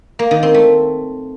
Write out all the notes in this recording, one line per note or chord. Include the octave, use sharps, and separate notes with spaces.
A#3
D#3
C4
A3